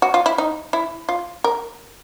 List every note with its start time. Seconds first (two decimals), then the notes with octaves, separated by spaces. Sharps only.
0.02 F#4
0.14 F4
0.26 E4
0.38 D#4
0.73 E4
1.09 F4
1.44 A#4